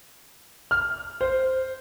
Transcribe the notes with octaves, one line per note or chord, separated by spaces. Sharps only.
F6
C5